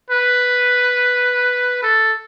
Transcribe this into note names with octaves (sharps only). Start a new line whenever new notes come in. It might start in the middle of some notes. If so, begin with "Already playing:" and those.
B4
A4